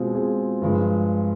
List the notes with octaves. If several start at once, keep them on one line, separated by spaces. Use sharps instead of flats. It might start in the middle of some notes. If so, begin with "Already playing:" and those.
Already playing: B2 G#3 C4 F4
F4 G#4
G2 F3 G#3